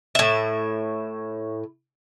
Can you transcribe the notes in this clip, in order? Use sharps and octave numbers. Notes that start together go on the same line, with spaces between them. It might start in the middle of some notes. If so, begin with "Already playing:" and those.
A2 E5